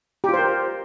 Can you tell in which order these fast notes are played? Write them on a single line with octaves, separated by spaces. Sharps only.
G4 F4 C5 A#4